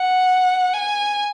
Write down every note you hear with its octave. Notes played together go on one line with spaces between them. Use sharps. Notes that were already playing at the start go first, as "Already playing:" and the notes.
Already playing: F#5
G#5